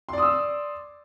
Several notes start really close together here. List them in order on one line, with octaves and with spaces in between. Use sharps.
C6 D5 D#6 E6